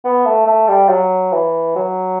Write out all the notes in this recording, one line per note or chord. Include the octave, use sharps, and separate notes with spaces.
B3
A3
A3
G3
F#3
E3
F#3